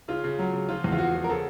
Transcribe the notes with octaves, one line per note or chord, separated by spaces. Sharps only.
C#3 F4
C#3
F#3
C#3
F3 F4
E2
F4
F3 F#4
F3
A#4
C#3 A4